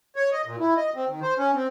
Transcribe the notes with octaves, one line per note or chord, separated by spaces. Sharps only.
C#5
D#5
A#2
E4
D#5
C4
D#3
C5
C#4
C4